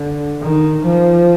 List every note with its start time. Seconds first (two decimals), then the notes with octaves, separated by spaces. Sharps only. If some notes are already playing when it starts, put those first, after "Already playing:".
Already playing: D3
0.42 D#3
0.85 F3